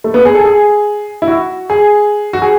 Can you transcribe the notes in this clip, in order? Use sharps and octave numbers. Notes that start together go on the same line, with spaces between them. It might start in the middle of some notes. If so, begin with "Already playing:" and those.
A3
B3
G#4
A4
G#4
E4
F#4
G#4
F#4
G#4